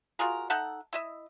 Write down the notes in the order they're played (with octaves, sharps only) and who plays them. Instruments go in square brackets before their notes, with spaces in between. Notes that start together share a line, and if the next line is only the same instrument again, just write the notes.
[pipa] F4 F#4 G#4 A#4
D#4 A4 E5 F#5
E4 D#5 E5